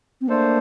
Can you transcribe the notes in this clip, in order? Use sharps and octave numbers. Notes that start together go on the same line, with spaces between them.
C4
A3 A#3 D4 A4 C5